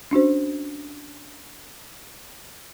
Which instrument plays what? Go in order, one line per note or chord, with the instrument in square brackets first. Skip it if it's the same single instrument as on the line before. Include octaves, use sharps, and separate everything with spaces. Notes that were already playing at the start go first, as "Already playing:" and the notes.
[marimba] C#4 D4 F#4 C5